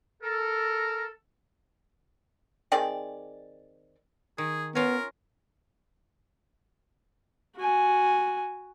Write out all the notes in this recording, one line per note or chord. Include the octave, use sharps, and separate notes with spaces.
A4 A#4
D#3 C4 G#4 D5
D#3 G#4
B3 C#4 F4 A#4
F#4 G#5